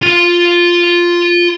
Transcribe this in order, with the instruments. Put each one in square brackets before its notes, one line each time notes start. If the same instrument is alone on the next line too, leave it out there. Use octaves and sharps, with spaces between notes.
[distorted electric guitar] F4 C6